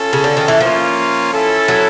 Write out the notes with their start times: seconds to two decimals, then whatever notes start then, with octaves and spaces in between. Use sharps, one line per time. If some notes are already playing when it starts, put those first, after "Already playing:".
Already playing: C#4 F4 A4
0.13 C#3
0.24 D3
0.37 D#3
0.48 E3
0.60 F3 A#3 C#4 F4
1.32 C#4 E4 A4
1.68 F#3